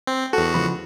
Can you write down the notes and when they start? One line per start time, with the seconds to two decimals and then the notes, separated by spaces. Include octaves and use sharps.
0.07 C4
0.33 E2 F#4 A4
0.54 C#2 F3 B5